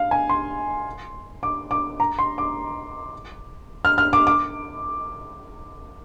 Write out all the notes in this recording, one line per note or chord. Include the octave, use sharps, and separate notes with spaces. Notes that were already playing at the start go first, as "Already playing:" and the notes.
Already playing: F5
G#5
C6
D6
D6
A#5
C6
D6
F6
F6
D6
D6